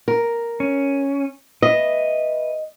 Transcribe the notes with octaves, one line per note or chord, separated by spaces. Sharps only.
A#4
C#4
B4 D#5 E5